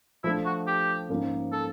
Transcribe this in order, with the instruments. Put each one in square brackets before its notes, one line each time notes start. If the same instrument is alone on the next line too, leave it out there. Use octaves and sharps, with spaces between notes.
[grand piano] F3 A3 D4 [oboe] E4
[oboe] F#4
G4
[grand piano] G#2 F3 A#3 C#4
[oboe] A4